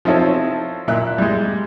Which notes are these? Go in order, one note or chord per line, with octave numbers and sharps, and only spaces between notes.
F3 C4 D#4 E4 A4 C#5
A#2 E4 F#6
G3 G#3